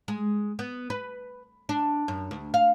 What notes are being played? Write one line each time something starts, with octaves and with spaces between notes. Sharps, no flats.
G#3
B3
B4
D4
F#2
D2
F5